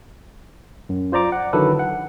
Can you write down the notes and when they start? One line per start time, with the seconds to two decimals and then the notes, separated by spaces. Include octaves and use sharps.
0.89 F#2
1.12 F4 C5 D5 A#5 D6
1.32 F#5
1.53 D3 D#3 F#3 E4 A4 B4
1.79 F#5